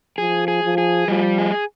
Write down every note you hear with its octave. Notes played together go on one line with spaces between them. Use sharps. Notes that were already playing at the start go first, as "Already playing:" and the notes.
F3 G#4
G#4
F3
G#4
F3 G3
G#4